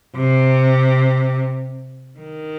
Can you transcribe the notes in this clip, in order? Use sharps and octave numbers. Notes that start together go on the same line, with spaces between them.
C3
D#3